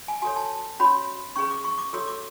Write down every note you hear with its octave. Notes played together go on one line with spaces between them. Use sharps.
G#5
F#4 A4 C#5 G#5
A5
C#4 F#4 C#5 B5
C#4 G#4 B4 C#6
D6
C#6
D6
F#4 A4 C#5 E6
D6